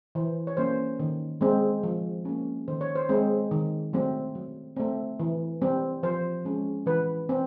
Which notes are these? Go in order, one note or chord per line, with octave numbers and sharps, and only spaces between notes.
E3 C5
C#5
G3 A#3 C#4 C5
D#3
G#3 C4
F3
A#3 C#4
D#3 C5
C#5
C5
G#3 C4
D#3
F#3 A3 C4
F#3
A3 C4
E3
G3 C4
F3 C5
G#3 C#4
E3 B4
C4